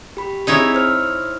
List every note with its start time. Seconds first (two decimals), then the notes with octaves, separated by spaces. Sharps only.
0.17 G4 B5
0.47 C4 D#4 E4 G#4 C#5
0.75 C5 F6